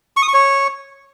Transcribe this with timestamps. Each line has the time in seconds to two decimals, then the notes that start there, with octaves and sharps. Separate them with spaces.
0.17 C#6
0.22 D#6
0.28 C#6
0.34 C#5